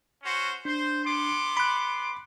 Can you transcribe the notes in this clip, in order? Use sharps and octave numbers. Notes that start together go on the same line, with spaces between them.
C#4 F#4 C5
D4 C5
B3 C6 D6
B5 F#6